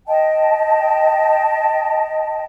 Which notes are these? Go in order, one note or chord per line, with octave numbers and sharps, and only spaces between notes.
D#5 G5 A5